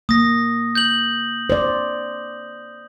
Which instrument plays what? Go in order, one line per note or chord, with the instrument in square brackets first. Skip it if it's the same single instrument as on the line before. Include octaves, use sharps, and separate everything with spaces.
[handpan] A#3 [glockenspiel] D#6 A#6
[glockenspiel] G6 F#7
[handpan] C5 D5